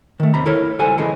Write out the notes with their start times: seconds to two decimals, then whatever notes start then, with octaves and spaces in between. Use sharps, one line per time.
0.20 D#3 A3
0.34 D#2 C3 A#5 B5
0.46 E4 A4 A#4 C#5
0.79 C#2 G3 F#4 A4 C5 G#5
0.98 C#3 E3 G#3 A4